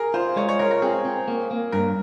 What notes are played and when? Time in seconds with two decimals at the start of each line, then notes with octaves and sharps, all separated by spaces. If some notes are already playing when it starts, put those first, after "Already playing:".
Already playing: G#4 A#4
0.14 F4 C5
0.36 G#3 C#5
0.49 C#5
0.59 F4 A#4
0.71 A#4
0.82 C4 G#4
1.05 C4
1.28 A#3
1.51 A#3
1.72 G2 A#4